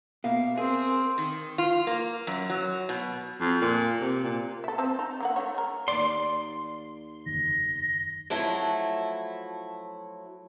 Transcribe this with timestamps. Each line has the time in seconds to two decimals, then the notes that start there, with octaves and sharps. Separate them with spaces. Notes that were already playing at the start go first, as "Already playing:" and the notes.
0.24 B2 A#3 E5 F5
0.58 C4 G#4 A#4
1.18 D#3
1.58 F4
1.87 A#3
2.27 F#2
2.50 F#3
2.89 B2
3.41 F2
3.61 A#2
4.01 C3
4.24 A#2
4.64 A4 E5
4.78 C4 A5
4.99 D#4
5.20 D3 A#3 F#5
5.36 A3 D#4 C#5
5.54 G#4 A#4
5.88 D#2 D5 C6
7.26 F#1 E2 D#3 A#6
8.30 F3 F#3 A3 E4